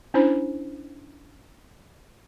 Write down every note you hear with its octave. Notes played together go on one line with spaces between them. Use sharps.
C#4 D4 E4 C5 B5